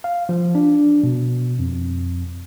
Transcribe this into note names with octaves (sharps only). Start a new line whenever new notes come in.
F5
F3
D4
B2
F2